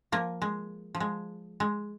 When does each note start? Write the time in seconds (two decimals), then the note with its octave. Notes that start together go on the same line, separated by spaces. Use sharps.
0.12 F3 A#3
0.42 G#3
0.95 F3
1.00 G#3
1.60 G#3